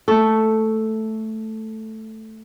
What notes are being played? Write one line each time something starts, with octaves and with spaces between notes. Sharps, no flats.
A3 A4 C#6